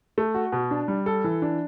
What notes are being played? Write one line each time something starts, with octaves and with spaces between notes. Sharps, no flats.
A3
F#4
B2
D4
G3
A4
E3
D4